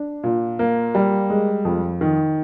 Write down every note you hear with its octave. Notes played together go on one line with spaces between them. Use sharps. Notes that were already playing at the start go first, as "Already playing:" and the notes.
Already playing: D4
A#2
A#3
G3
G#3
F2
D#3